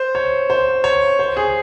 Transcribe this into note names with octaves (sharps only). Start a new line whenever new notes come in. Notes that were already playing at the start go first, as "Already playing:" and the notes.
Already playing: C5
C#5
C5
C#5
C5
G#4